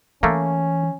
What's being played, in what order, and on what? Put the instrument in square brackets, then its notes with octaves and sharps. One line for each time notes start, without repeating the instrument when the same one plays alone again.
[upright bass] E3 [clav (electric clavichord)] A3 A#3 [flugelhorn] C#4